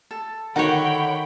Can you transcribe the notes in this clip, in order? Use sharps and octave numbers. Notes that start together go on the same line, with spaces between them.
A4
D3 D#3 F#4 C#5 F#5 G5 B5